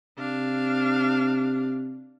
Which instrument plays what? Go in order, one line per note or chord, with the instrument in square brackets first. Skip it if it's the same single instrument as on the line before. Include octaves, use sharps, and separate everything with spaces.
[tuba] C3 [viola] D4 F5